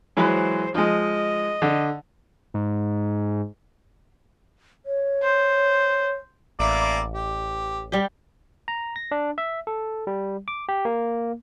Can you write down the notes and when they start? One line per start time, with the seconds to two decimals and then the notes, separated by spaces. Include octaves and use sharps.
0.17 E3 F#3 G#3 C5
0.75 F3 G#3 D#5
1.62 D3
2.54 G#2
4.86 C#5
5.22 C5
6.59 A1 A#3 E4 D5
7.14 G4
7.92 G3 G4
8.68 A#5
8.96 A#6
9.11 D4
9.38 E5
9.67 A4
10.07 G3
10.48 D6
10.69 G4
10.85 A#3